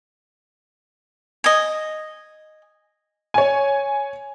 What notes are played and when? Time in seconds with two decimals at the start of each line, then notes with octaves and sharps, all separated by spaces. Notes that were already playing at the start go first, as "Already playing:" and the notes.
1.44 D#5 G#5
3.34 C#5 G#5